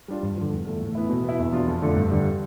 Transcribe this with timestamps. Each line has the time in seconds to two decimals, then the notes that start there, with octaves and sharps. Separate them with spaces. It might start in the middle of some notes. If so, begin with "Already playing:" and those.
0.08 G3 D4 F4
0.23 G2
0.36 D3 F3
0.52 E2
0.66 D3 A3
0.80 A2
0.95 E3 B3 E4
1.10 B2
1.24 B3 E4
1.39 E2
1.53 B2 B3 D4 F4
1.67 F2
1.82 D3 A3 D4 F4
1.96 G2
2.11 D3 G3 D4